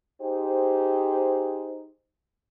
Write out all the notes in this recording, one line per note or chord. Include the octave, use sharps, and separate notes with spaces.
D#4 G4 G#4 C5